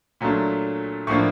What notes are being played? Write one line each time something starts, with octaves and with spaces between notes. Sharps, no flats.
A#2 F#3 A3 D4
A2 F3 A#3 D4 C#6